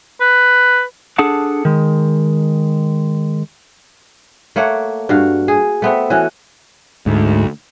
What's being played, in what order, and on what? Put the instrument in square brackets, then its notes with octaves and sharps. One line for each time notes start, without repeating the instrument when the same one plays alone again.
[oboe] B4
[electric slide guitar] D4 G#4 A4 F#5 A5
D#3 G#3
[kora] A3 A#3 C#5 F#5
G2 F#4 F5
G#4
A3 B3 C4
E3 C#4 F#4
[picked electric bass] D2 [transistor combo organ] G#2